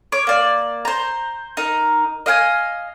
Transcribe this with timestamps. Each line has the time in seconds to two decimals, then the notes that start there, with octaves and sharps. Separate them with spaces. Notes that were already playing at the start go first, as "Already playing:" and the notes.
0.12 C#5 D6
0.27 A#3 D5
0.85 C5 A#5
1.57 D#4 A#4
2.26 D#5 F5 G5 G#5